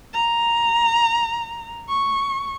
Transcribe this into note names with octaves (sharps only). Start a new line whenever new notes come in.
A#5
C#6